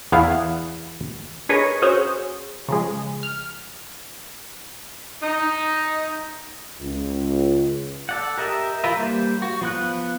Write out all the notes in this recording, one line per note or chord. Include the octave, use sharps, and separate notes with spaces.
E2 B3 E4 F5
D4 G#4 A#4 B4 C#5 D#5
C#4 F#4 G#4 C5 C#5
C#3 F3 G#3
F6
D#4
C#2
A4 D5 F#5
G4 A#4 D#5 E5
E3 F4 A#4 B4 E5
G3 A#3 C5
F#4
F3 B3 F#6